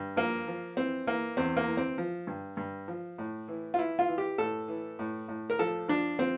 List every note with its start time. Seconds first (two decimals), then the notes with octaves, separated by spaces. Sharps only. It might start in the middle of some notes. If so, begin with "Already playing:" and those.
Already playing: G2
0.16 F3 A#3
0.47 F3
0.77 E3 C4
1.06 E3 A#3
1.37 E2 C4
1.57 A#3
1.67 E3
1.77 C4
1.98 F3
2.27 G2
2.57 G2
2.88 F3
3.18 A2
3.48 E3
3.74 F4
3.78 E3 E4
3.99 F4
4.08 E3
4.18 G4
4.38 A2 A4
4.68 E3
4.99 A2
5.28 A2
5.50 A#4
5.59 F3 A4
5.88 F3 D4
6.19 F3 C4